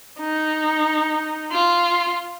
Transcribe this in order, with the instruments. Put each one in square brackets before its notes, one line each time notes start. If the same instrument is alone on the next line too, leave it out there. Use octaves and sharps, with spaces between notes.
[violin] D#4
F4